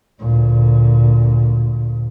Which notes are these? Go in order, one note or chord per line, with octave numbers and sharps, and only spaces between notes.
D2 A#2